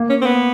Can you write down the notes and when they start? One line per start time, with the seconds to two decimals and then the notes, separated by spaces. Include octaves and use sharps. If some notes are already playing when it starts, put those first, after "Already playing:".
Already playing: A#3
0.09 C#4
0.21 C4
0.26 B3